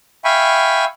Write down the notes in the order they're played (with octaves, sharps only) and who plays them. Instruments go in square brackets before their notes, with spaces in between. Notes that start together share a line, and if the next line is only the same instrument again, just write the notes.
[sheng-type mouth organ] E5 F5 G5 G#5 B5 C#6